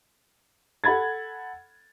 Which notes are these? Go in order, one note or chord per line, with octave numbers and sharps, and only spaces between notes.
A4 F#5 B5 G#6 A6